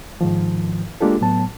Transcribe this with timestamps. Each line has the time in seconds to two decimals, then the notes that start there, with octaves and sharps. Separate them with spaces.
0.21 G#2 D#3 F3
1.01 G#3 A#3 D4 F4 G4 A4
1.21 A2 F#3 B3 A5